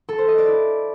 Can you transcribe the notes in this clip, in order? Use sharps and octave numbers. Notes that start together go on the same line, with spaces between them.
A4
C5
D#5
D5
E4